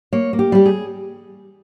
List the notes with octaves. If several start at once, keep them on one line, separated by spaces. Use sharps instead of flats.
A#3 C#5
A#3
G4
G3 G4
G#4